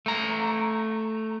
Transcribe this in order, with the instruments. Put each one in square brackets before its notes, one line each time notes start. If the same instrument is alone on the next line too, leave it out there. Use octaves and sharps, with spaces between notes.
[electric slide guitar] A3 A#5